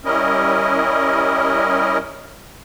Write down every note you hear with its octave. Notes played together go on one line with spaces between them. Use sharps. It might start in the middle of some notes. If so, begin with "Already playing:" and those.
G3 C#4 E4 A#4 D#5